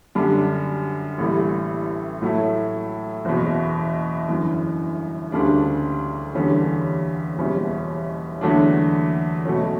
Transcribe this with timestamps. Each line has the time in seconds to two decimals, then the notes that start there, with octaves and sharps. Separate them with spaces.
0.15 F#2 D3 G3 D4
1.18 A1 A2 E3 G3
2.22 A2 F#3 A3 E4
3.25 F#1 E2 B2
4.29 G1 F#2 E3
5.32 D2 C#3 G3 D4
6.35 E2 D3 G3 C#4
7.38 F#1 E2 B2 G3 C#4
8.41 E2 D3 F#3 A3 D4
9.45 B2 F#3 A3 C#4